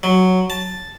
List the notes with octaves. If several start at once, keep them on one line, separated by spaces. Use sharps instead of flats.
F#3
A5